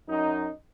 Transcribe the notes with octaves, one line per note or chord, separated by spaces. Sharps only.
F#2 D#4